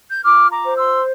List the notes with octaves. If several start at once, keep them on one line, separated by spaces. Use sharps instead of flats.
G6
F4 D6 F6
A#5 D6
C5
C6 E6